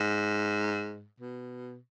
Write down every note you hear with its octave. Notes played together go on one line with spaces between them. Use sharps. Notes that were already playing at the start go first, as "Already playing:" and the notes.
Already playing: G#2
B2